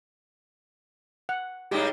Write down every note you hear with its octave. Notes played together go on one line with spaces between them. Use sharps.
F#5
A2 G3 G#3 D#4 G4